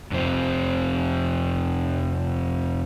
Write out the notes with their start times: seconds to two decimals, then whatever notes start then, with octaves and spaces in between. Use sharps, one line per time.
0.12 F2 C3 C4